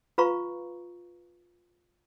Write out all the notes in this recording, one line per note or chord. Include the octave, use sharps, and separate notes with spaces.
F4 B4 F5 A#5 C#6